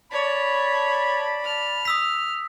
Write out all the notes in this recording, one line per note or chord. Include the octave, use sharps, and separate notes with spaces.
C#5 D5 A5 B5
F6
D#6 E6 B6